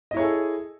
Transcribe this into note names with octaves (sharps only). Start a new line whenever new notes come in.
E4 G#4 A4 C#5 D#5